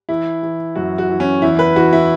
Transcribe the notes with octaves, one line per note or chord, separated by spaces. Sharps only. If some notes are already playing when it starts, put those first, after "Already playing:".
E3 E4
E3
F#2 F#4
F#4
E3
C#4
E2 E4
B4
E3 F#4
E4